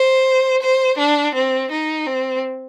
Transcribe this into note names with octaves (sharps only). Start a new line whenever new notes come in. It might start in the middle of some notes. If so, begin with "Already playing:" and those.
Already playing: C5
C5
D4
C4
D#4
C4